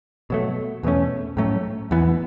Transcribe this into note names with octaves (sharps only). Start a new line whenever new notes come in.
B2 F#3 A3
E2 B2 A3 C#4
A2 F#3 A3 C#4
E2 E3 B3